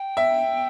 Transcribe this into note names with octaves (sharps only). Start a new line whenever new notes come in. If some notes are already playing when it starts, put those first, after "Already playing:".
Already playing: G5
E5